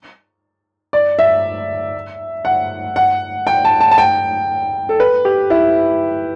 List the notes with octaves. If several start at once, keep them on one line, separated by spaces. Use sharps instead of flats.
D5
E5
F#5
F#5
G5
A5
A5
A5
G5
A4
B4
G4
E4